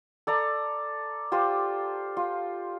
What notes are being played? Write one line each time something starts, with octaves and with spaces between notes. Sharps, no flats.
A4 D5 A#5
F4 G4 C5
F4